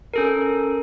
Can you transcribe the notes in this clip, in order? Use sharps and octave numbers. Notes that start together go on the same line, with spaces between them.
C#4 A4 A#4